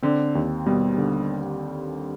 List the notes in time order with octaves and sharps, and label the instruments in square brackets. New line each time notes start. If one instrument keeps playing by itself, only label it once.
[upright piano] D3 [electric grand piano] C4
[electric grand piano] D#2
[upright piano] B2 [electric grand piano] G3
[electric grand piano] D3